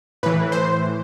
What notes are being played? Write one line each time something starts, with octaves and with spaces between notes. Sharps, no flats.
A2 E3 B4
C5